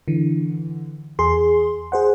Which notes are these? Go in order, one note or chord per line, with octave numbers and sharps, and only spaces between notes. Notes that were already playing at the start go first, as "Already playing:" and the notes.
D3 E3
E2 G#4 C6
G#4 C5 F#5